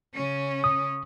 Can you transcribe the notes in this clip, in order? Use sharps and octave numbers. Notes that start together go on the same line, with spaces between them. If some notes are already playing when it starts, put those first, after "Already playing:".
C#3 C#4
D#6